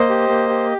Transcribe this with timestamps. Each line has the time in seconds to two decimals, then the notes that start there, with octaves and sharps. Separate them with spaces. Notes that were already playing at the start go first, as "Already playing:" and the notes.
Already playing: A#3 C5 D#5
0.09 G4
0.29 A#3
0.49 G4